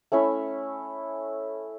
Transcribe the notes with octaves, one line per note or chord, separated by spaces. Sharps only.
A3 C#4 E4 E5